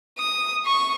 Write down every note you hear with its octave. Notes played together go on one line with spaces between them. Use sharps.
D#6
C#6